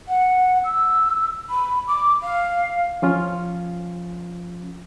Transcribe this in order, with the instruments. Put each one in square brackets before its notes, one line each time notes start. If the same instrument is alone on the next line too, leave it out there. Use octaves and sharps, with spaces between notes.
[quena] F#5
E6
B5
D6
F5
[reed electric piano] F3 C#4 F4